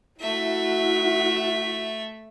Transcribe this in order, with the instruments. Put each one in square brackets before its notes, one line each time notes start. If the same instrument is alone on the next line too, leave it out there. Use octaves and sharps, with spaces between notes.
[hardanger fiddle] A3 E5 [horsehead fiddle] E4 F#4